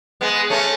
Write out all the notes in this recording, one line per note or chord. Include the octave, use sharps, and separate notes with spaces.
G#3 B3
A3 C#4